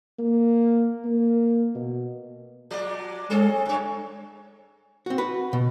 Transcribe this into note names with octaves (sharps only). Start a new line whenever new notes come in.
A#3
A#3
B2
F3 G#3 D5
G#3 C4 G#4 A4
G#5
F#2 C#5
C4 F#4
F#4 B4
B2